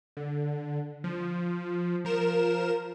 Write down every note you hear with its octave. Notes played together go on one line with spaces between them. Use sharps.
D3
F3
F3 A#4 E7